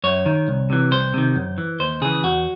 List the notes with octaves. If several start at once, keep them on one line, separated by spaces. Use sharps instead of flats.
F#2 C#5
D#3
C2
C3 E3
C2 C5
C3 D#3
F#2
E3
D#2 C5
C#3 E3 G#4
E2 F#4